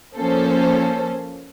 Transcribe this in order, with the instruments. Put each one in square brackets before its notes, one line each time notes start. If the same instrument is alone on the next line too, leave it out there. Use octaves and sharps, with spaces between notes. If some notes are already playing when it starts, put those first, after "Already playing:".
[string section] F3 A#3 C#4 A4 C5